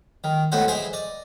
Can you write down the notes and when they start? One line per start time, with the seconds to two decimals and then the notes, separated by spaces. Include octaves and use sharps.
0.24 D#3
0.52 A2 B3 F#4 C5 D#5
0.68 E3 E4 G#4 C5 D#5
0.93 D5 D#5